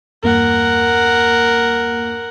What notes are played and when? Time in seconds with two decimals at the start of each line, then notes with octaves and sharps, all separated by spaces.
0.23 E2 G2 A#3 A#4 F#5